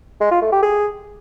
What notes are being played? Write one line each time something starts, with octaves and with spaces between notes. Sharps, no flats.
G#3
F4
A3
G4
G#4